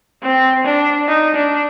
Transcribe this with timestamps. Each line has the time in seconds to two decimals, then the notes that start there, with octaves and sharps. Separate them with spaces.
0.23 C4
0.65 D4
1.08 D#4
1.35 D4